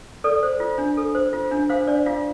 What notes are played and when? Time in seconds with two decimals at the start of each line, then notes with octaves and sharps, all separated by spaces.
0.24 A4 D5
0.43 C5
0.60 F4
0.78 D4
0.97 A4
1.15 C5
1.33 F4
1.51 D4
1.70 C5 F5
1.87 D4 D5
2.06 F4 F5